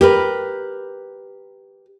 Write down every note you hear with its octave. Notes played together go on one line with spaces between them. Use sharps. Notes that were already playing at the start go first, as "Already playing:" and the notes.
G4 A#4 B4